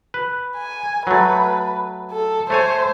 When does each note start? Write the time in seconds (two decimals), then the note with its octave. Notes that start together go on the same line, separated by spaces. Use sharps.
0.14 B4
0.56 G#5
1.07 F#3 A3 B4
2.12 A4
2.50 A3 C5 C#5 G#5